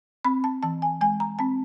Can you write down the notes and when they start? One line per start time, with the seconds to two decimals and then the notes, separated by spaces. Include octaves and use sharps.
0.25 C4 B5
0.44 A5
0.63 E3 A5
0.82 G#5
1.01 G#3 G#5
1.20 A#5
1.39 C4 A5